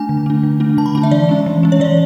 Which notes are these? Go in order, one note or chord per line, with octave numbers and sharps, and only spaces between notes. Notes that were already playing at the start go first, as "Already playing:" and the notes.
Already playing: A3 D4 G#5
D3
A3 D4
D3
A3 D4
D3 A5
B5
A3 D4 A5
E5
E3 D5
G#3 C#4
E3
G#3 C#4
C#5
E3 D5